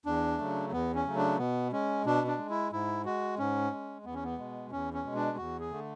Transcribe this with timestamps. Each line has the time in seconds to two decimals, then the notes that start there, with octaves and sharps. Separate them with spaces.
0.06 E2 D4
0.38 C#3 F#3 A3
0.72 E2 B3
0.95 C#4
1.05 C#3 F#3 A3
1.17 D4
1.38 B2 B3
1.72 G#3 C#4
2.05 B2 D4
2.27 D4
2.38 G#3
2.50 E4
2.72 G#2 E4
3.05 G#3 F#4
3.38 G#2 C#4
3.72 G#3
4.05 E2 B3
4.14 C#4
4.24 B3
4.38 B2 G#3
4.72 E2 C#4
4.93 C#4
5.04 B2 G#3
5.16 D4
5.37 E2 F#4
5.60 G#4
5.71 D3 A3